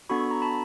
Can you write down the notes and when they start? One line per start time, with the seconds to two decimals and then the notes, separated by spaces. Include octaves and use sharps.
0.09 B3 D4 F#4 A4 B5 C#6
0.31 A#5
0.42 A5 B5